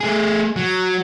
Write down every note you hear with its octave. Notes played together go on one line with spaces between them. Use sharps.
A3 G#4
F#3